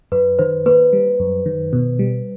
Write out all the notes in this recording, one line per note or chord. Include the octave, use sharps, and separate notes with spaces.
F#2 B4
D#3 C5
A#3 B4
G3
F#2
D#3
B2
G3